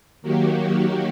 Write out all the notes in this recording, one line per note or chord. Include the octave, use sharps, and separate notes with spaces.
D#3 F#3 A#3 F#4 G4